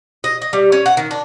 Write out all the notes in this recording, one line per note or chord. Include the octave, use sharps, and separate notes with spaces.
D#5
D#5
G3
C#4
F#5
D#3
D4